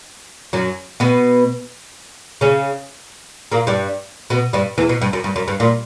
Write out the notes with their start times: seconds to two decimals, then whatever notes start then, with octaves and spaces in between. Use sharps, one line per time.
0.53 F#2 F#3
1.00 B2 B3
2.41 C#3 C#4
3.52 A#2 A#3
3.67 G2 G3
4.30 B2 B3
4.53 G2 G3
4.78 E2 E3
4.89 B2
5.01 G2
5.13 F#2
5.24 G2
5.36 F#2
5.48 G2
5.60 A#2